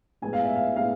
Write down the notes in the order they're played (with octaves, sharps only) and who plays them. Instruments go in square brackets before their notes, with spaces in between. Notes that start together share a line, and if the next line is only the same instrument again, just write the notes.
[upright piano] A2 G#3 B3 G#5
F5
E5
F5
A2 G#3 B3 F5